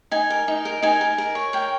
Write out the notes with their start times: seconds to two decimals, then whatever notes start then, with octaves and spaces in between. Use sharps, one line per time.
0.11 D#4 G#5
0.30 A#4
0.48 D#4
0.65 A#4
0.83 D#4 G#5
1.01 A#4
1.18 A#4
1.35 C#5
1.53 A#4 G5